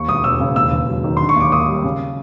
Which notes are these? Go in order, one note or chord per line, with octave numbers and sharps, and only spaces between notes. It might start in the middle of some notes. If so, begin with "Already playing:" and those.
Already playing: D#2 C#6
E1 D#6
E1 E6
C#3
D#2 E6
E1
F#3
D#3
D3 C6
C#6
D#2 D6
A#3 D#6
G3
C#3